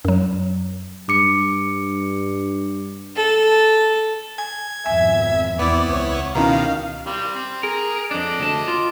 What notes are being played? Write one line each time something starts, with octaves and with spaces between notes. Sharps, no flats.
F#2 F#3
G2 D6 C#7
A4
G#5 G#6
G#1 F2 B2 E5 G#5
E5
E2 B3 C4 E4 D5
C#2 B4 C#5
B2 D#3 C#4 E4 F5 A#5
G3 C4
C4
G#4 A#4
F2 D4 D#5 D6
D2 A5
F4